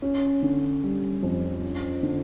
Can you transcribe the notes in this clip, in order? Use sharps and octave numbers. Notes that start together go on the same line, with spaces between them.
C#4
D3
G3
F2
C#4
D3